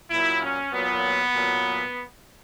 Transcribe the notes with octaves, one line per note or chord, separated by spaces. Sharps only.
A#2 F#3 E4
C#4
A#2 F#3 B3
A#2 F#3